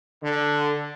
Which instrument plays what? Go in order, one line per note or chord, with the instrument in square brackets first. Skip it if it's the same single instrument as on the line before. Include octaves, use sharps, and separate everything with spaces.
[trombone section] D3